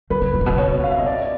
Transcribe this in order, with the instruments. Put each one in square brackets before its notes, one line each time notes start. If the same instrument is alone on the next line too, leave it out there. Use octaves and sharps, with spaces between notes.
[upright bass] D#3 [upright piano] B4
[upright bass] D3
C3
A#2
B2
C3
[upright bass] B2 [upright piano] C#5
[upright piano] F5
E5
D#5
D5